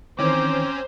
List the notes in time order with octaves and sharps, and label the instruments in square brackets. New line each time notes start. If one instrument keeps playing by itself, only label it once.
[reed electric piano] D#3 E3 [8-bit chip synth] C4 C#4 [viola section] C5 [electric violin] A#5 D6